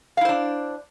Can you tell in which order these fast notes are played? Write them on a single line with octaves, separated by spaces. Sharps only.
F5 E4 C5 D4